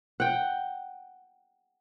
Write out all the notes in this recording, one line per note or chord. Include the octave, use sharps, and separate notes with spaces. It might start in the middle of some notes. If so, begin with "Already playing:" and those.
F#5 G5